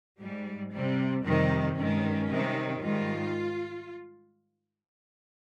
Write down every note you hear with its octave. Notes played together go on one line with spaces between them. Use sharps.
G#2 G3
C3 G3
F2 C3 D#3 G3
G2 D#3 G#3 C#4
C3 D#3 G3
G#2 D#3 G3 F4